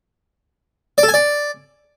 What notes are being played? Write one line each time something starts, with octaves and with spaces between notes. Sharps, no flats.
D5
A4
G#5
D5